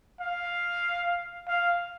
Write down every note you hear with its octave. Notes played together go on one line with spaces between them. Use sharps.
F5
F5